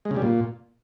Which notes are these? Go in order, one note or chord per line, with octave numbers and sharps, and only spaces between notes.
G#3
C#3
G3
A#2